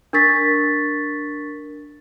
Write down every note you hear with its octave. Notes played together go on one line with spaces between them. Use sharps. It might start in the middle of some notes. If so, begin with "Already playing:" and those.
D4 A#4 C#6 A6 B6